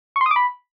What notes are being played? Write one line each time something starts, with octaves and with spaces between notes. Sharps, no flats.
C#6
C6
D#6
D6
B5